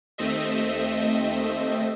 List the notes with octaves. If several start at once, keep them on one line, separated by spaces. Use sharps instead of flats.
D#2 A3 C4 D#5 E5